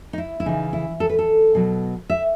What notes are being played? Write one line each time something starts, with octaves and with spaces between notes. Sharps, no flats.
D#4
E4
E4
C#3 E3 D#4
E4
A4
B4
A4
B2 F#3
E5